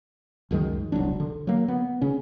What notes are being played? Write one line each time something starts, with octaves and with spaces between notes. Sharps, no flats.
C#2 F#2 D#3 G#3
E1 C2 F#3 D4
D3
F#3 A#3
B3
C#3 C#4